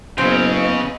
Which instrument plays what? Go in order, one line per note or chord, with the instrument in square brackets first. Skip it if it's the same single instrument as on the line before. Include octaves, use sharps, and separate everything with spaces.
[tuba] F#1 [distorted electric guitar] C#3 [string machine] B3 B4 D#5 [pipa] C4